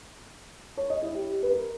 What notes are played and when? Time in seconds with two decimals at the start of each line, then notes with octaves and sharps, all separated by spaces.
0.77 C#5
0.90 D#5
1.02 E4
1.14 G4
1.43 B4
1.50 A#4